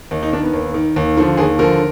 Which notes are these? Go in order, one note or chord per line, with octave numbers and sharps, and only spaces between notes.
D#2 D#4
D#4
D#3 D4
B3
D#2
D#3
D#2
D3 F3
D#2 G#4
D3 F3 A#4